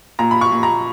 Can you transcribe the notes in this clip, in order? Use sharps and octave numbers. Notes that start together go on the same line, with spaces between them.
A#2 A#5
B5
C#6
A#2
A#5